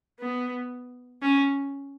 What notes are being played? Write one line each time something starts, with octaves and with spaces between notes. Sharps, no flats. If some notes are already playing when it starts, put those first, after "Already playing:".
B3
C#4